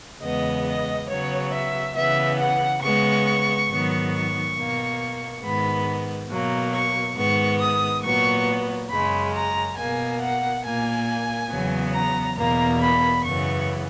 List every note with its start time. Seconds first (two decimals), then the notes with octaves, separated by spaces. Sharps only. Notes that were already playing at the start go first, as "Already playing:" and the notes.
0.21 E2 C#3 G#3 B3 D#5
0.66 D#5
1.08 C#3 F#3 B3 C#5
1.52 E5
1.95 C#3 E3 B3 E5
2.38 F#5
2.82 C#3 G#3 B3 C#6
3.69 G#2 D#3 F#3 B3
4.12 C#6
4.55 B2 A#3
5.42 G#2 D#3 G#3 B3 B5
6.30 B2 F#3 A#3
6.72 C#6
7.16 G#2 D#3 G#3 B3 C#6
7.59 D#6
8.03 A#2 F#3 B3 C#6
8.89 F#2 C#3 G#3 B5
9.33 A#5
9.77 B2 A#3 G#5
10.20 F#5
10.64 A#2 A#3 G#5
11.50 E2 C#3 F#3 B3
11.93 A#5
12.36 E2 B2 A#3 A#5
12.81 B5
13.24 F#2 C#3 E3 B3 C#6